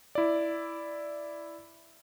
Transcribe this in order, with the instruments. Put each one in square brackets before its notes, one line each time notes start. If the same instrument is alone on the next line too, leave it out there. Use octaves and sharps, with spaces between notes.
[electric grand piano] E4 D5